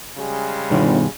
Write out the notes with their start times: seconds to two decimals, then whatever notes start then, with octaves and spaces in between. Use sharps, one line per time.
0.17 C#3 G3 G#3
0.70 G1 G2 B2 D#3